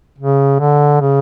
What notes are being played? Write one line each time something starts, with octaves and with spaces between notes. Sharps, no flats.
C#3
D3
C#3